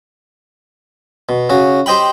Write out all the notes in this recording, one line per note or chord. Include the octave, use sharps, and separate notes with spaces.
B2
C#3 F#4
G4 C5 D#5 G5 B5